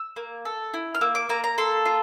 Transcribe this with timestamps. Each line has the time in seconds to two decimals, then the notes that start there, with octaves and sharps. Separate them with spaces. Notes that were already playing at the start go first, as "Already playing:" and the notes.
Already playing: E6
0.16 A#3
0.45 A4
0.74 E4
0.95 F6
1.01 A#3 E6
1.15 D6
1.29 A#3 A#5
1.44 A#5
1.58 A4 C6
1.86 F4